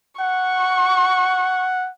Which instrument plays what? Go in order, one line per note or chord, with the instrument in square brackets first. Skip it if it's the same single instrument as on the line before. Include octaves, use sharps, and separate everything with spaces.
[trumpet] F#5 [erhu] C#6